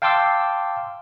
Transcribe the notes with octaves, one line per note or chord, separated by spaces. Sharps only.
F5 G5 A5 C6 D6 E6